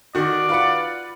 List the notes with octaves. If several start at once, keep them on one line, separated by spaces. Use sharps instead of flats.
D#3 F#4 D5
F4 B4 F#5